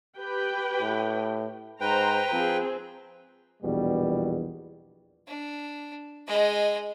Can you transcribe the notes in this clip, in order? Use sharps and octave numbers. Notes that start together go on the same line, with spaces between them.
G4 B4 G5
A2
G#2 B4 C5 G5 A#5
F3 C4 G#4
A#1 E2 B2 G3
D4
G#3 D#5